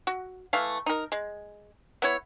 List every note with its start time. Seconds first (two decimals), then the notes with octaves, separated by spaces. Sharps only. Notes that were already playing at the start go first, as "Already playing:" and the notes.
0.07 F#4
0.53 E3 A3 F5
0.86 D#4 A#4
1.12 G#3
2.02 B3 E4 C#5